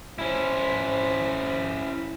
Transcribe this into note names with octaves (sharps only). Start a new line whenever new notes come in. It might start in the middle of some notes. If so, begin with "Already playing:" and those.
C#4 E4 C5